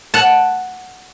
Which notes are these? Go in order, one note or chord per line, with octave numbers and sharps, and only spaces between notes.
F#5 A5